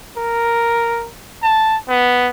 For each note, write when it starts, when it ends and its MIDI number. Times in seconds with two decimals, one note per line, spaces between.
0.17 1.08 70
1.43 1.77 81
1.89 2.30 59